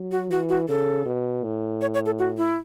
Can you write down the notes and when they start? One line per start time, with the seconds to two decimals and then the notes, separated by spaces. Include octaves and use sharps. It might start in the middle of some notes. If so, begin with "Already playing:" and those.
Already playing: F#3
0.11 F#4
0.31 E3 F#4
0.49 F#4
0.68 C#3 A4
1.06 B2
1.44 A2
1.81 C#5
1.94 C#5
2.06 A4
2.19 F#4
2.37 E4